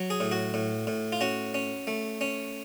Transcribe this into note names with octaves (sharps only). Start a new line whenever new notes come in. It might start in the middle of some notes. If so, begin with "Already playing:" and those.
Already playing: F#3
G#4
A2
F#4
A2
A2
F4
C#4 F#4
C#4
A3
C#4